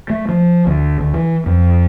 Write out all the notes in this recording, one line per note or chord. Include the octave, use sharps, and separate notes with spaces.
A3
F3
D2
D2
E3
F2